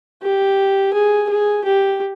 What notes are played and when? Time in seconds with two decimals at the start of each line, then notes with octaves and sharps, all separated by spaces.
0.22 G4
0.94 G#4
1.29 G#4
1.64 G4